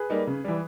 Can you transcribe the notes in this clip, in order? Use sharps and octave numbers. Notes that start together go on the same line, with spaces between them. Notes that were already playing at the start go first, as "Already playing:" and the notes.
Already playing: G#4 B4
G3 A#3 D#4
C#3
E3 G3